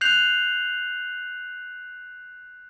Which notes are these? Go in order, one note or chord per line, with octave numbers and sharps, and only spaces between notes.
F#6 G6 C7 F7 F#7